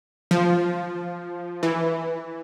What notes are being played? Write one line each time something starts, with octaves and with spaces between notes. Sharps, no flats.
F3
E3